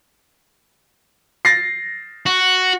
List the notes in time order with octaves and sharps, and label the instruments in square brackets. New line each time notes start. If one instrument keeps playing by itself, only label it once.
[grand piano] A6 A#6 C7
[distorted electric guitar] F#4